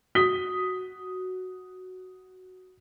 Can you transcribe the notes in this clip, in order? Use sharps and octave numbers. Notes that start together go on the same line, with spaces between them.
F#4 D#6 B6 G7